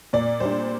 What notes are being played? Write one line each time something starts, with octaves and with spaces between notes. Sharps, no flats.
A#2 D5
G3 D4 C5